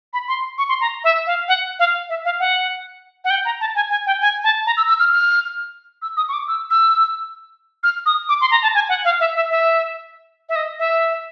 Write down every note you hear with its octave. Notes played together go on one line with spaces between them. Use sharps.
B5
C6
C#6
C6
A#5
E5
F5
F#5
F5
E5
F5
F#5
F#5
G5
A#5
A5
G#5
G#5
G5
G#5
A5
A#5
E6
E6
F6
F6
E6
D#6
C#6
D6
E6
E6
F6
D#6
D6
C6
A#5
A5
G#5
F#5
F5
E5
E5
E5
E5
D#5
E5